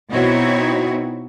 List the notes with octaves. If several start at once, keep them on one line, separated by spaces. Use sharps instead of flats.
B2 C4 D#4 E4 F#4 C#5